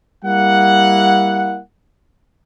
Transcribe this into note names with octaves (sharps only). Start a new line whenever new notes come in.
G3 A#3 E4 F#5